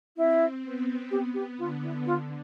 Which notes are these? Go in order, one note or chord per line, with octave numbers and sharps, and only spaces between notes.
C4 E4
B3
G4
G4
D3 F4
E4
D3 F4